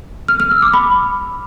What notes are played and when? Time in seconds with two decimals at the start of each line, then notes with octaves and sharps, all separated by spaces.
0.28 F6
0.40 F6
0.51 E6
0.62 D6
0.73 B5